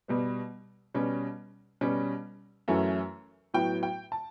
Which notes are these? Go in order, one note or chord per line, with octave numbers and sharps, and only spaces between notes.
B2 G3 B3
B2 G3 C#4
B2 G3 C#4
F#2 E3 A3 C#4
A2 F#3 B3 G5
G5
A5